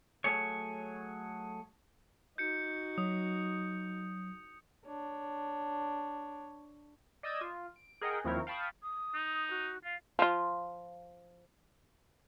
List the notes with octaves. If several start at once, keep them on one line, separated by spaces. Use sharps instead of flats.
F#3 A3 G#4 C#5
D#4 F#4 G6 C#7
F#3 D#6
D4 C#5
D5 D#5 D#6 E6 G6 G#6
F4
D7
G#4 A#4 D#5 F#5 G5
D#2 F3 C4 E4 A#4 C#5
F5 G5 A5 B5 C#6 D#6
D#6
D#4
F#4
F4 F5
F3 F4